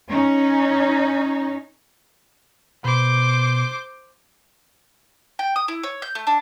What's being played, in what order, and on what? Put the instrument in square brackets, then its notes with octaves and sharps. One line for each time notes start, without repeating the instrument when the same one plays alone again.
[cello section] C#4 D#4
[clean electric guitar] B2 B5 [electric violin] C5 D6
[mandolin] G5
D#6
E4
C#5
G6
A3
D4